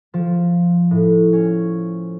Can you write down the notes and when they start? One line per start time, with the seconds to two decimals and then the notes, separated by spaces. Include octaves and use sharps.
0.14 F3
0.91 A2
1.33 C#4